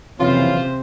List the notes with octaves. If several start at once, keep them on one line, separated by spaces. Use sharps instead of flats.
F#1 F2 C3 E3 C#4 F4 C5